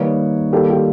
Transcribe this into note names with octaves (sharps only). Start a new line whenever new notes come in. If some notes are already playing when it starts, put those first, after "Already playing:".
Already playing: D#3 G3 A#3 D#4 B4 C#5
D#3 G3 A#3 G4 A4
F4 G4